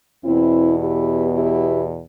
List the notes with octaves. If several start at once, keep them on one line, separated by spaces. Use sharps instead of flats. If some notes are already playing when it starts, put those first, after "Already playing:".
E2 B2 C4 E4
E4 G4
E4 G4